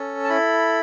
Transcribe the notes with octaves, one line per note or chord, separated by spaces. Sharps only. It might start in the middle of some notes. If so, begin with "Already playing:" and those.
Already playing: C#4 A4
A5
E4 B5